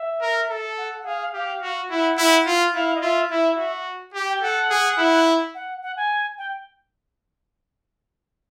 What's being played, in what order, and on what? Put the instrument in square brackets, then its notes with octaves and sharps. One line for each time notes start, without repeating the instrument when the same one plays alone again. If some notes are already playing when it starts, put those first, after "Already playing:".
Already playing: [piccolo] E5
[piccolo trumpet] A#4
A4
[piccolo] F#5
F#5
[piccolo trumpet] G#4 [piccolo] F5
[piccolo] F5
[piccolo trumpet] G4 [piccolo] F5
[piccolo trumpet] F#4
[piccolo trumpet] E4 [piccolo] F#5
[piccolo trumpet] E4
F4
[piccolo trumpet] E4 [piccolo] F5
[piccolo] D#5
[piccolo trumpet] F4 [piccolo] E5
[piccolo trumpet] E4 [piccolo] E5
[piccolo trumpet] F#4
G4
[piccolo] G5
[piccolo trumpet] A4 [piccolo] F#5
[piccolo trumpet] G#4
E4
[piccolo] F#5
F#5
G#5
G5